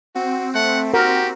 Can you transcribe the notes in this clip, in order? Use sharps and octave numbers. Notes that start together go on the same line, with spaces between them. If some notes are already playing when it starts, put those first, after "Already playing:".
C4 F#4
A3 F#5
F#4 G4 A#4